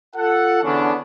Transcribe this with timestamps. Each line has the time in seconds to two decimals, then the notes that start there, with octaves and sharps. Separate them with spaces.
0.16 F4 A4 F#5
0.62 E2 D3 E3 B3 C#4 D4